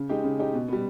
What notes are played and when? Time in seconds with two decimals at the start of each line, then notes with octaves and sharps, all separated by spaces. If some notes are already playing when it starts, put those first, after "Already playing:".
Already playing: C#3
0.09 G#3 D#4 G4
0.24 C#3
0.39 G#3 D#4 G4
0.53 B2
0.68 G3 B3